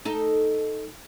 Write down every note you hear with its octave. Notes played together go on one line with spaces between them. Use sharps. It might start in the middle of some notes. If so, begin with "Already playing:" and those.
D#4 A4